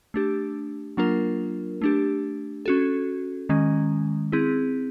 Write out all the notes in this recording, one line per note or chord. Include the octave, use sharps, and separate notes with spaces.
A3 D4 G4
F#3 A#3 D4 F4 A#4
A3 D4 G4
C#4 F#4 A4
D#3 G#3 C#4
C4 E4 G#4